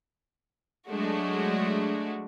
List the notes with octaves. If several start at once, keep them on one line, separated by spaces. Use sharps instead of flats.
F#3 G#3 A3 D4 F#4